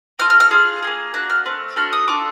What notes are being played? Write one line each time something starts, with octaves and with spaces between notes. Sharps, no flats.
C4 F4 A4 F6
F6
F6
D4 F4 G#4
A#3 D#4 G#4
A#3 D4 F#4 F#6
F6
A3 C4
A3 D4 F#4 A4 F6
D#6
D4 F4 A4 D6